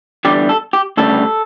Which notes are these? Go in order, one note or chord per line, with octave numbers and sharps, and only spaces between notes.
E2 D3 G3 G4
A4
G4
D2 C#3 G3 A4